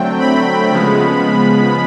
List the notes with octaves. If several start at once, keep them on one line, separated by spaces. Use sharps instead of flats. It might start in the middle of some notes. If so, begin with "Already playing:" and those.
Already playing: D3 F#3 A3 C4 G5
B5
C#3 F3 G#3 B3